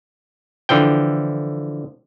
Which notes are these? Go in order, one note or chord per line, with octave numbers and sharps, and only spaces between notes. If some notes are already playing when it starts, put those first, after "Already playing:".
D3 E3 F3 G5